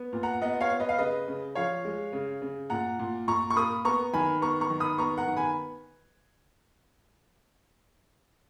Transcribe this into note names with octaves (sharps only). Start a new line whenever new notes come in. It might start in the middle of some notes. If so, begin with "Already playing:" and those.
Already playing: B3
A#2
F#5 A#5
B3 D#5 F#5
C#5 F5
B3
B4 D#5
F5
C#3 B4 D#5
C#3
F3 C#5 F5
G#3
C#3
C#3
A#2 F#5 A#5
A#2
A#2 A#5 C#6
C#6
A#3 B5 D#6
B3 A#5 C#6
D#3 G#5 B5
B3 A#5 C#6
A#5 C#6
D#3
B5 D#6
B3 A#5 C#6
F#5 A#5
D#3
G#5 B5